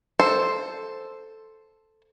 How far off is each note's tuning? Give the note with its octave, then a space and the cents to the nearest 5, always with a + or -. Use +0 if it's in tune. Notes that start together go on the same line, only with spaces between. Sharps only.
A4 +0 C5 +0